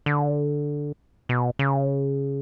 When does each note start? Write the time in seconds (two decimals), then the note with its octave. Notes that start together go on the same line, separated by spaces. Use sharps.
0.06 D3
1.29 B2
1.59 C#3